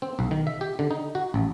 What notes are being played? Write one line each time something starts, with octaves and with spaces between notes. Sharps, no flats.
C4
B1
D#3
E5
G4
D3
D#4
F#4
A1